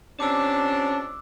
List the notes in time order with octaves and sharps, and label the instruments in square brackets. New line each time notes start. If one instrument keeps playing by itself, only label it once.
[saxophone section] F2 C3 D4 [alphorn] C#4 [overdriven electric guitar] A5 [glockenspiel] D6 E6